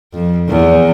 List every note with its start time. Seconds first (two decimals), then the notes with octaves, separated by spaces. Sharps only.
0.13 F2
0.50 E2